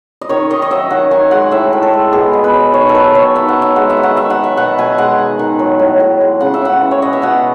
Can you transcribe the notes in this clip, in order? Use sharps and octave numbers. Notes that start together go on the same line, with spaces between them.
D#5
D#3 C#5
D#3 D#5
D#5
F#3 E5
D#3 F#5
D#3 G#5
G#3 F#5
A2 E5
A2
A4
G#3
B2 G#4
B2
B4
F#3
D#3 C#5
A4
D#3 B4
F#3 C#5
D#3 E5
F#5
D#3
E5
G#3 F#5
E5
D#3
F#5
D#3 E5
F#5
F#3
E5
B2 F#5
B2 G#5
G#3 F#5
D#3
D#3
F#3
A2
A2
G#3
C#3 F#5
E5
C#4 F#5
E3
C#5
B2 D#5
E5
B2 F#5